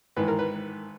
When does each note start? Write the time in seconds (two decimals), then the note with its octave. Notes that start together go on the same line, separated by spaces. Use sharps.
0.16 G#1 G#2 E3 B4
0.28 A#4
0.39 B4